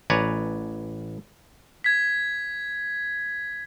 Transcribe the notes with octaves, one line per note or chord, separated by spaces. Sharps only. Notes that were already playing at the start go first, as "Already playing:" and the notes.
A1 B4 C#5 D5 G#5 A#5
G#6 B6